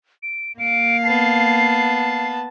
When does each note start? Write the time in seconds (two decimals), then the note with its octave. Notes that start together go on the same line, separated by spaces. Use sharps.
0.23 D7
0.59 A#3 F5 D7
1.04 B3 A5 C7